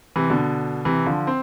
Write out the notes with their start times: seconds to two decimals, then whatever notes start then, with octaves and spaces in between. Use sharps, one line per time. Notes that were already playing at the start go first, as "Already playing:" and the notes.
0.16 C3 E3
0.30 B2 D3
0.85 C3 E3
1.06 D3 F3
1.27 C4